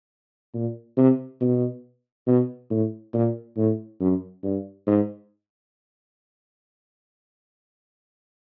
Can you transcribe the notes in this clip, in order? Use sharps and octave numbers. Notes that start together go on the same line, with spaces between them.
A#2
C3
B2
B2
A2
A#2
A2
F#2
G2
G#2